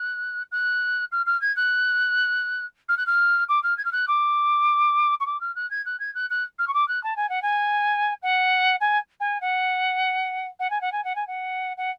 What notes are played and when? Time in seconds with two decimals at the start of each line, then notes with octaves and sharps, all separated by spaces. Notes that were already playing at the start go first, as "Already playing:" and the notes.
Already playing: F#6
0.52 F#6
1.12 F6
1.26 F6
1.41 G#6
1.56 F#6
2.89 F6
2.97 F#6
3.07 F6
3.49 D6
3.63 F6
3.78 G#6
3.85 F6
3.92 F#6
4.08 D6
5.20 C#6
5.26 D6
5.41 F6
5.56 F#6
5.71 G#6
5.86 F#6
6.00 G#6
6.15 F#6
6.30 F#6
6.59 F6
6.68 C#6
6.74 D6
6.88 F#6
7.04 A5
7.16 G#5
7.29 F#5
7.42 G#5
8.23 F#5
8.81 G#5
9.20 G#5
9.41 F#5
10.59 F#5
10.70 G#5
10.81 F#5
10.92 G#5
11.04 F#5
11.15 G#5
11.27 F#5
11.77 F#5